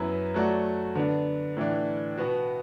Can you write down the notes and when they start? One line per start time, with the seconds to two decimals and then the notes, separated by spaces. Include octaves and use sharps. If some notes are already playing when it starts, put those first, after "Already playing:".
Already playing: F#2 F#3 B3 E4 B4
0.34 F#3 A3 F#4 D5
0.95 D3 B3 D4
1.57 A2 E3 D4
2.18 B2 B3 F#4